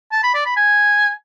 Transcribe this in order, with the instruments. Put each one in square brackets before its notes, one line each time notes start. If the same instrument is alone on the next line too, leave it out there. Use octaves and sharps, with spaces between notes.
[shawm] A5
B5
D5
B5
G#5